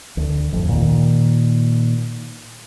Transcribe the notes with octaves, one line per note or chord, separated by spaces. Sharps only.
D2
A1 F2
A#2 D#3